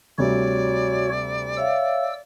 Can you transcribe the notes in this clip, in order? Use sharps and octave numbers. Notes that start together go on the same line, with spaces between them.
D2 C3 G3 F#4 C#5 D5
C#5 E5 F5 E6